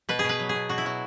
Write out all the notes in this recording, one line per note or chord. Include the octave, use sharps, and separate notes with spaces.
B2 B4
B2 G#4
B4
F#3
G#4
B2
B2 F#4
E4
F#3 F#4